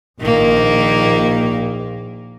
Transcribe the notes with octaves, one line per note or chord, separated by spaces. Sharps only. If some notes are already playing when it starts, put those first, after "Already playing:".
A#1 D#3 A#3